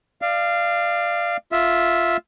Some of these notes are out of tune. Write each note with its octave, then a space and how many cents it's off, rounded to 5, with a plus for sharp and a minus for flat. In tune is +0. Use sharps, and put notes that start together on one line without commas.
D5 +25 F5 -15
F4 +0 E5 +0